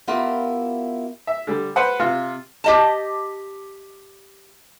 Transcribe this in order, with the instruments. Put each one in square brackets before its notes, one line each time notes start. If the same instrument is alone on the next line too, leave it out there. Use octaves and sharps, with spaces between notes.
[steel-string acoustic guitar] B3 E4 F4 G4 A#4 E5
[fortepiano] E5
D3 G3
B4 C5 F#5
C3 F4
[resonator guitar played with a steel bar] G4 D#5 A5